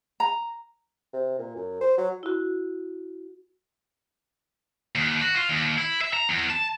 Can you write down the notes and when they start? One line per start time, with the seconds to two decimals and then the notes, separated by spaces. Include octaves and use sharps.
0.20 A#5
1.13 C3
1.39 A#2
1.56 F#2
1.81 C5
1.98 F#3
2.23 E4 F#4
4.95 D#2
5.21 F#4
5.35 F4
5.49 D#2
5.78 E4
6.01 E5
6.13 A#5
6.29 E2
6.50 A5